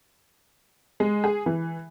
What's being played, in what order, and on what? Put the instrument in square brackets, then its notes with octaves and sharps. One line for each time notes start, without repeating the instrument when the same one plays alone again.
[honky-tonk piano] G#3
G#4
E3